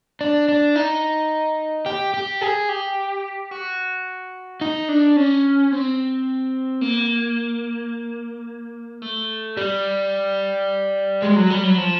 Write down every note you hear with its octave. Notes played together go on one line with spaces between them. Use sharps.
D4
D4
D#4
G4
G4
G#4
G4
F#4
D#4
D4
C#4
C4
A#3
A3
G3
G#3
F#3
G3
F#3
F3